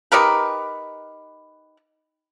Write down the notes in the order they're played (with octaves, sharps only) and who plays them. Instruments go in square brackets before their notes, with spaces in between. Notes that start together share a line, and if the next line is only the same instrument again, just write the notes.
[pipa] D#4 G4 A#4 B4